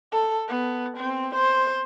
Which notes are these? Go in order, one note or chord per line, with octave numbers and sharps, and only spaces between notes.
A4
B3
C4
C5